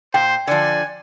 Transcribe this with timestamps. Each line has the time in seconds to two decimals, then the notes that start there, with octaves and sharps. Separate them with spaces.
0.14 A#2 C5 G5
0.47 D3 F3 D5 G#5